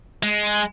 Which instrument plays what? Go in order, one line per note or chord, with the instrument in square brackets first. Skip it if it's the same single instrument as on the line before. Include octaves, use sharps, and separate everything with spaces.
[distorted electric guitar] G#3